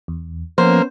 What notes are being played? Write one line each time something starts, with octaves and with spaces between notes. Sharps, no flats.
E2
F3 A#3 B3 C#4 C5